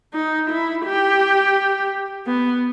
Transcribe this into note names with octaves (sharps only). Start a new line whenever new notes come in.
D#4
E4
G4
B3